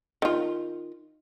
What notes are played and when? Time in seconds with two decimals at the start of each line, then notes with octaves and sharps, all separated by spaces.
0.22 D#3 F4